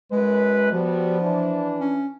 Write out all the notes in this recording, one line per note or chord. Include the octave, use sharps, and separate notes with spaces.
F#2 G#3 B4
F3 G3 B3 F#4
E3 D4
C#4